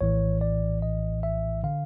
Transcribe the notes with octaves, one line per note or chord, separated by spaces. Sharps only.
A#1 A2 E3 C#5
D5
D#5
E5
D3 F5